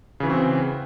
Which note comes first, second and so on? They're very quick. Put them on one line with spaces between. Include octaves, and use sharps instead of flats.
C#3 E3 F#4 C4